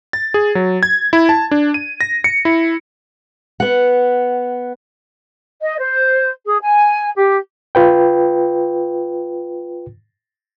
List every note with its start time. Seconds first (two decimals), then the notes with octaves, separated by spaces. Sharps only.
0.13 A6
0.34 G#4
0.55 F#3
0.83 G#6
1.13 E4
1.29 A5
1.51 D4
1.74 D#7
2.01 A#6
2.24 C#7
2.45 E4
3.60 B3 F#5
5.62 D#5
5.79 C5
6.45 G#4
6.62 G#5
7.17 G4
7.75 F4 B4 G5